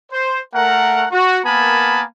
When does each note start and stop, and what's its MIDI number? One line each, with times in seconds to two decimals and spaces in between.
0.12 0.40 72
0.55 1.06 57
0.55 1.06 70
0.55 1.06 78
1.11 1.40 66
1.45 2.03 58
1.45 2.03 59
1.45 2.03 70
1.45 2.03 80
1.45 2.03 81
1.45 2.03 83